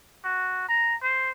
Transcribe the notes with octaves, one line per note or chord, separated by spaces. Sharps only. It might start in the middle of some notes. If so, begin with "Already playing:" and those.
F#4
A#5
C5